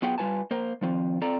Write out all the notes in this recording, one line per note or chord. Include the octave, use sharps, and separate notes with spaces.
F#3 B3 F4 G#4 F#5 G5
G3 F4 B4 G#5 A5
A#3 A#4 C5
D#3 F3 C4 F4
C4 F4 A4 D5 A#5